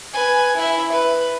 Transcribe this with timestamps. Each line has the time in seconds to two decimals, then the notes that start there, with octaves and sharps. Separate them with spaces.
0.13 B4 G#5
0.56 E4 E5
0.92 B4